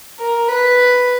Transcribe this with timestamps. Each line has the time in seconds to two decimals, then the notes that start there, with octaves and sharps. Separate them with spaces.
0.19 A#4
0.48 B4